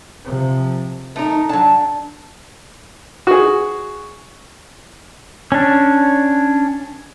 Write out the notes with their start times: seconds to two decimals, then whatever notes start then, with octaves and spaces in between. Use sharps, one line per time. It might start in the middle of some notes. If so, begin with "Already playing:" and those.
0.25 C3 F3
1.16 A3 D#4 A#4
1.49 F#3 D4 A5
3.27 F#4 G#4
5.52 C#4 D4